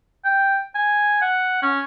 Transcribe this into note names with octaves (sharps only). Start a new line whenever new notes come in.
G5
G#5
F#5
C#4